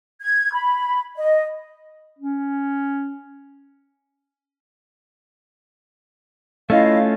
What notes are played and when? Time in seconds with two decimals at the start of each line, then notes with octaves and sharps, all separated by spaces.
0.21 G#6
0.54 B5
1.17 D#5
2.19 C#4
6.70 A3 C#4 E4 F4 D#5 F5